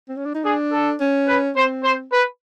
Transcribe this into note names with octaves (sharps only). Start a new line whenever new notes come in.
C4
C#4
D4
D#4
D4 G#4
A4
C#4
B4
C4 C5
C5
B4